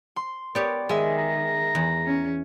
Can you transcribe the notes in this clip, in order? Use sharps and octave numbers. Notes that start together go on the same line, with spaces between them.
C6
B3 G4 A#4 C#5 D5
D#3 G#3 G#4 D#5 E5
A#5
E2
C#4